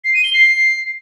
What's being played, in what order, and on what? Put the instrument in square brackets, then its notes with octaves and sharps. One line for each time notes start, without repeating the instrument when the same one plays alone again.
[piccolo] C7
D#7
G7
C7